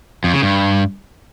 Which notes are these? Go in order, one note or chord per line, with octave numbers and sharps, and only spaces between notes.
F2
C#3
G2